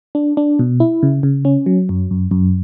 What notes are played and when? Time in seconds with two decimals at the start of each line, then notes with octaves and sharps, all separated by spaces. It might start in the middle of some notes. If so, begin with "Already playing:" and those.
0.15 D4
0.37 D4
0.59 B2
0.80 E4
1.03 C#3
1.23 C#3
1.45 C#4
1.66 F#3
1.89 F#2
2.11 F#2
2.31 F#2